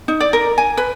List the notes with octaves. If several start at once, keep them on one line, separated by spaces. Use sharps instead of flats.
D#4
D5
A#4
G#5
B4